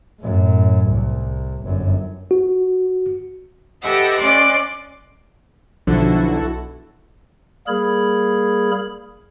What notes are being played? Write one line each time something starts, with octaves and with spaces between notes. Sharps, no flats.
F#2 A2
C2
G1 F#2
F#4
G4 A4 B4 D#5 E5 F#5
C#4 D5 D#5 C6 D6 F#6
B1 D3 F3 E4 F#4 A4
G3 A#3 G#4 A#4 B5 G#6